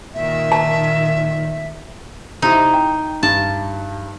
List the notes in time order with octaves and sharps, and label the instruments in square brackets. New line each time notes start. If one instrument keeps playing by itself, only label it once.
[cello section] A#2 D#3 [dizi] E5
[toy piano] A5
[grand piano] C3 C4 E4 [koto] D#4
[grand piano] G5
[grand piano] G2 [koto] A5